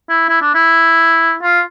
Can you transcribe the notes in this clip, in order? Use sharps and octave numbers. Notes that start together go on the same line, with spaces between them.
E4
E4
D4
E4
F4